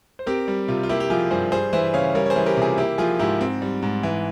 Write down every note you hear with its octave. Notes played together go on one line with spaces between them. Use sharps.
C5
C4 G4 A#4
G3
C3 F4
F4
A#3 E4 G4
G4
F3 F4 G#4
G2 G#4 C5
G3 G#4 C5
E3 C5 E5
C#3 C#5 F5
G3 A#4 C#5
C#5
G#4 C5
E3
G4 A#4
C3
F4 G#4
A#3 E4 G4
F3 F4 G#4
G#2 E4 G4
C4
G3
G#2
E3